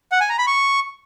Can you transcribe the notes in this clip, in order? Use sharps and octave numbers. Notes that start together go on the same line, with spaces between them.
F#5
G#5
A#5
B5
C#6